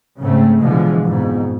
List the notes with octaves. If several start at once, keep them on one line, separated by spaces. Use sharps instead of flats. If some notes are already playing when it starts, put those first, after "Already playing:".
G#2 C#3 A3 C4
B2 D3 E3 F3 G#3
F2 G#2 B2